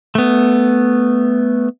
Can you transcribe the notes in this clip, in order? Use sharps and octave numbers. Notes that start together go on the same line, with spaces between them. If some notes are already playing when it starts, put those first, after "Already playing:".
A3 B3